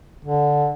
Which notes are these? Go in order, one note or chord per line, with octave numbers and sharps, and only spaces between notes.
D3